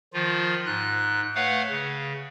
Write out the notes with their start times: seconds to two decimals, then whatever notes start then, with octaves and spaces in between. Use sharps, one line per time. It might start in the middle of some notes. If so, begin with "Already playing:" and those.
0.13 D#3 F3 F4
0.66 G#2 F#6
1.35 A3 B4 C#5 F5 F#5
1.70 C#3